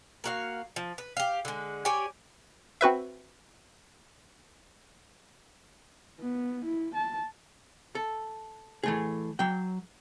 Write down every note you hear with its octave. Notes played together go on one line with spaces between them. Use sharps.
A#3 F#4 F5
F3
B4
G4 F5
D3 G#3
G4 C#5 D5 G#5
C4 F#4 B4 E5
B3
E4
A5
A4
E3 A3 G#4
F#3 G5